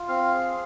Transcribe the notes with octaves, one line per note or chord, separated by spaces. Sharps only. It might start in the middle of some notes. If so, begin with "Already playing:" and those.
Already playing: F4
C4 F5
G#4